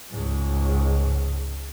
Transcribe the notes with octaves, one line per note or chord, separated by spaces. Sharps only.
C#2 G#2